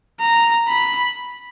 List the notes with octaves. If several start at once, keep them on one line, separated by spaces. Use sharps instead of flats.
A#5
B5